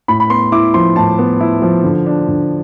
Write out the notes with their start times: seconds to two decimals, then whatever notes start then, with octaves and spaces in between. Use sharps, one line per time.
0.08 A2 B5
0.20 B5
0.30 B3 C6
0.52 E4 D6
0.74 F3 C6
0.96 A2 A5
1.18 B3
1.40 E4
1.62 F3
1.84 D3
2.06 D4
2.28 D3